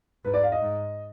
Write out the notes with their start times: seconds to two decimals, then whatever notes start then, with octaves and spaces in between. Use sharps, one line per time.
0.25 G#2 B4
0.34 D5
0.43 F5
0.52 D#5
0.62 G#2